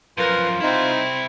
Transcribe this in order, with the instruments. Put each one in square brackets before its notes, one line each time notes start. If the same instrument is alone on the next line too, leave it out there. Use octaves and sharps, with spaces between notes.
[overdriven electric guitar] F#2 F3 [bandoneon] F4 [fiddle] A#4 [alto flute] B4
[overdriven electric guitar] C3 E4 [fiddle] C4 [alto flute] D#4